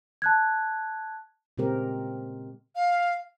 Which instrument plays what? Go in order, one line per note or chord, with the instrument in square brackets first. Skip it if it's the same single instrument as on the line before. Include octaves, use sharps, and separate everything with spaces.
[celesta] A5 F#6 G#6
[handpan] A#2 C#3 G#3 C4 G4 A#4
[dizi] F5